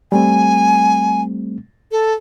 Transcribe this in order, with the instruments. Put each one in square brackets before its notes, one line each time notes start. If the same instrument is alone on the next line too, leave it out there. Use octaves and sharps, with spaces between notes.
[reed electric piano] G3 A3 C4 [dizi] G#5
[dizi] A4